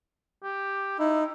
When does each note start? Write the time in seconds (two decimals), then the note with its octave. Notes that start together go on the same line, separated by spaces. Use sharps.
0.44 G4
0.99 D#4 E4